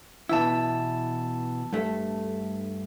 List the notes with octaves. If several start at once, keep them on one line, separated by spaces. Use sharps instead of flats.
B2 E3 E4 A5 E6
G2 A3